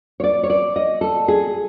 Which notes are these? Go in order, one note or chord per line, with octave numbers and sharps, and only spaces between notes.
C#5
D5
C#5
D5
D#5
A4
G#4